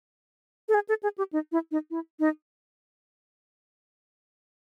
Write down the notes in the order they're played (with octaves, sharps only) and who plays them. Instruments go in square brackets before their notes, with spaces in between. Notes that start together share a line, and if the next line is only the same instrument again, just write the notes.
[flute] A4
G#4
A4
G#4
G4
D#4
E4
D#4
E4
D#4